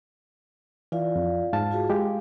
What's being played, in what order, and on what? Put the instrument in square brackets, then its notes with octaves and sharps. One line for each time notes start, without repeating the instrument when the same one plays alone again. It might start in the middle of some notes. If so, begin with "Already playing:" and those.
[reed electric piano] E3 [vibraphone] F4 D5 F5
[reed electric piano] F2
G#2 F5 A5
[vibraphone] F4 F#4 G#4
[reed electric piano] G#3 G4 [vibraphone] F5